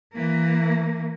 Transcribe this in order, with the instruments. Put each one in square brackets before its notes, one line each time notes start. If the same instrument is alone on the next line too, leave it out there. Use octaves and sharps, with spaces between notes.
[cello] E3 A#3